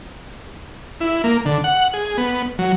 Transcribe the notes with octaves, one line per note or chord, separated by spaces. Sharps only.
E4
A#3
D3
F#5
G#4
B3
F#3